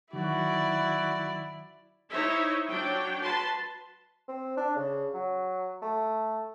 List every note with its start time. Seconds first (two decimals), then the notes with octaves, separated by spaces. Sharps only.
0.13 D#3 F#3 E4 F#4 D5
2.12 D#4 E4 C5 C#5 E5
2.70 F#3 D4 C#5 G5
3.20 F#4 B4 A5 C6
4.28 C4
4.57 D4
4.76 C#3
5.14 F#3
5.82 A3